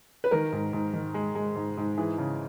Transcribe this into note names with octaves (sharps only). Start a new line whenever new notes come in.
B4
D#3 A#4
G#2
G#2
D#3
G#3
G#3
G#2
G#2
E3 G#4
C#3